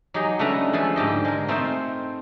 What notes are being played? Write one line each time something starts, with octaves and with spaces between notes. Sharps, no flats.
F#3 D#4 G4 G#4 D#5
C#3 A3 D4 A4 B4 A#5
F3 A3 G#4 A4
G#2 D3 G4 D#5
G#3 A#4
A3 C4 D#4 F4 C5